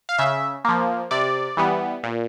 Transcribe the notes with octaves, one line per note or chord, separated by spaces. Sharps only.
F5
C#3 E5
F3 A#3
C3 D5
E3 G3 B3
A#2